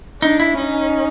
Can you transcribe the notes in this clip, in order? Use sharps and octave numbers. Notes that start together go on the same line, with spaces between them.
D4 D#4
E4
C#4 D#4